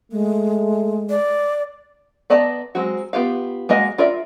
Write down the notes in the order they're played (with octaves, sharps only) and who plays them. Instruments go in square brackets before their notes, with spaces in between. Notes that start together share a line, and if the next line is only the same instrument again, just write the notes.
[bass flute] G#3 [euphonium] A3
[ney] D5
[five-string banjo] B3 D5 D#5 A5 A#5
F#3 G#3 C4 F#4
B3 F4 G4 F5
G#3 A#3 F#4 D#5
F4 A#4 D5 E5